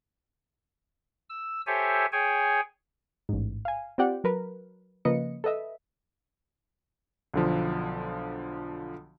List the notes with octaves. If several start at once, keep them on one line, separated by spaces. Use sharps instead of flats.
E6
G4 A4 C5 C#5 E5 G#5
G#4 C#5 G5 G#5
A1 G#2
F5 G#5
C4 F4 G4 D5 F#5 G5
F#3 A#4 B4
C#3 F3 A#3 B4 D#5 C#7
A4 B4 D#5 E5
B1 D3 F3